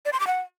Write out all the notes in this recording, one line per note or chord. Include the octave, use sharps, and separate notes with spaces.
D5
C6
D6
F#5